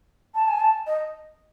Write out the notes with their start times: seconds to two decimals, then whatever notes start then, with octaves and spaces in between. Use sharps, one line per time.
0.35 A5
0.48 G#5
0.60 A5
0.86 D#5